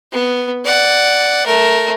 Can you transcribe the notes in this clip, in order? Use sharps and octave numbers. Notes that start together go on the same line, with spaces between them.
B3
D5 F#5
A3 A#4